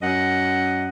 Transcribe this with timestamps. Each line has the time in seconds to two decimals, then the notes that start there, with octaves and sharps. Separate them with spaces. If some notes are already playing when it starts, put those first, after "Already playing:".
0.02 F#2 D#5 F#5